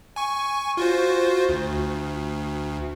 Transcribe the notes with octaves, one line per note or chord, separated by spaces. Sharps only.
G#5 C#6
F4 F#4 C5
D2